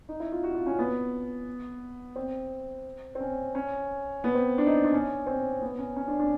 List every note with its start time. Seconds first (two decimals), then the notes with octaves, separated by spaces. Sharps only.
0.09 D#4
0.20 E4
0.32 F4
0.43 F#4
0.55 F4
0.66 C#4
0.79 B3
2.16 C4
3.15 C4
3.21 C#4
3.55 C#4
4.24 B3
4.35 C4
4.58 D4
4.67 D#4
4.85 D4
4.93 C#4
5.27 C4
5.61 B3
5.79 C#4
5.96 C#4
6.08 D4
6.19 D4